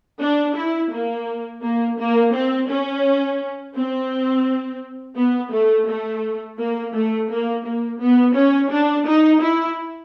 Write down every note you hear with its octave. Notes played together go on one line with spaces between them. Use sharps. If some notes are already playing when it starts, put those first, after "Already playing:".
D4
E4
A#3
A#3
A#3
C4
C#4
C4
B3
A3
A3
A#3
A3
A#3
A#3
B3
C#4
D4
D#4
E4